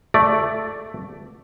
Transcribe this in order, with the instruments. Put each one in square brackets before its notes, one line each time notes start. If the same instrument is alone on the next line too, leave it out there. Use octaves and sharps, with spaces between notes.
[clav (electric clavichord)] A3 D5